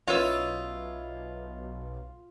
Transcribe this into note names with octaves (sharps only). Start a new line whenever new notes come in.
B1 C#4 E4 F4 B4 C#5 D#5 E6